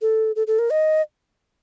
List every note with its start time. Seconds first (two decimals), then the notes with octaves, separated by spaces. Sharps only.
0.02 A4
0.36 A4
0.47 A4
0.59 A#4
0.70 D#5